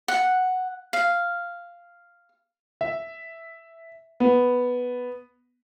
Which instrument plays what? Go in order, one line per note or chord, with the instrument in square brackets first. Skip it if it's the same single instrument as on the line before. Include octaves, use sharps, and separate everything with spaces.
[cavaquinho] F#5
F5
[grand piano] E5
B3